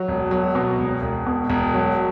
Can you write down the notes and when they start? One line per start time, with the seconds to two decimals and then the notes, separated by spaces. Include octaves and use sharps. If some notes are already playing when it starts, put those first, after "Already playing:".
Already playing: F#3
0.08 E1
0.31 F#3
0.55 B2
0.79 E1
1.02 E1
1.27 B2
1.50 E1
1.74 F#3